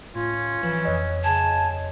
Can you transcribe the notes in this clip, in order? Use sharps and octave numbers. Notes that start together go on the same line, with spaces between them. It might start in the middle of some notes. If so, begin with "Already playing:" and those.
A2 C#4 F4
E3 F3
F2 C#5 D#5
C#3 G#5 A5